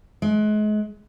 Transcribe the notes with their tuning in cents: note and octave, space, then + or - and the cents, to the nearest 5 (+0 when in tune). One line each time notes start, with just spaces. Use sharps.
G#3 +35